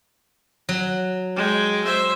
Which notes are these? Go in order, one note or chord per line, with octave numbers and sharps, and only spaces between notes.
F#3
G#3 G5
C5 E5